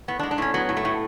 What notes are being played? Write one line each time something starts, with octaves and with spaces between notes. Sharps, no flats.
A2 B3
D4
G#3
D4
A2 C#4
F#3 B3
A2
A3
A2